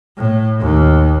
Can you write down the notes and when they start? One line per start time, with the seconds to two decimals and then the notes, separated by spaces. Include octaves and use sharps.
0.18 A2
0.60 D#2